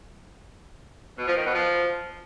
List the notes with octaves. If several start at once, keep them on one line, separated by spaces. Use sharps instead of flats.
B2
F3
D#3
B2
F3